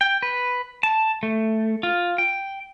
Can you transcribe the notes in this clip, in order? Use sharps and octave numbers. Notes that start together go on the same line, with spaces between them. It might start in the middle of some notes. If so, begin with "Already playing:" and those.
G5
B4
A5
A3
F4
G5